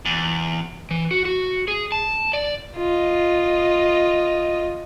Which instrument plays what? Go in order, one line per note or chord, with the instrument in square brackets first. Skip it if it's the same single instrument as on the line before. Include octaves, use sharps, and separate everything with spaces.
[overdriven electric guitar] E2
[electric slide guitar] E3
F#4
F#4
G#4
A5
D5
[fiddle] F4 D#5